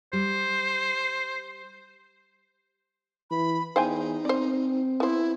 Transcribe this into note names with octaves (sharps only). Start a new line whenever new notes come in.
G3 C5
E3 B5
E2 D#4 C5 G5 G#5
C4 C5 D5
B3 E4 C5